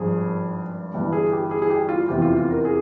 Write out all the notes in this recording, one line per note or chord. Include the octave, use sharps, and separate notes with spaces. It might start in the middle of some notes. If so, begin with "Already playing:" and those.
Already playing: G#1 G2 F3 G#4
G1 G2 E3
G#4
G4
G#4
G#4
G4
F4
F1 E2 C3 E3 G4
F4
F4
A#4
G#4